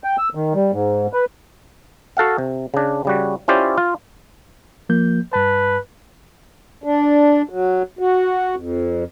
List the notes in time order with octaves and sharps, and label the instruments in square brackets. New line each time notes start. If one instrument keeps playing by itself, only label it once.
[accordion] G5
E6
D#3
G3
G#2
B4
[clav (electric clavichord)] F#4 A4 F5 F#5
C3
C#3 D4
C#3 G3 F#4
C#4 E4 F4 G4 C5 D5
F4
[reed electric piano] F3 A#3 G6
[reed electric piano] G2 A5 [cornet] B4
[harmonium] D4
F#3
F#4
F2